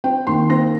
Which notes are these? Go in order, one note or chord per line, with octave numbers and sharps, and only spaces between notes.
C4 G5
D#2 C6
C4 A#6